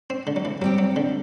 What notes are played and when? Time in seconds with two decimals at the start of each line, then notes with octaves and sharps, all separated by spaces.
0.10 C4
0.27 D3
0.36 F#3
0.45 E3
0.62 F#3 G3 C4 G4
0.78 F#3
0.96 D3